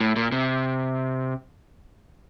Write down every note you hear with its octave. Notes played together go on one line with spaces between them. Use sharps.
A2
A#2
C3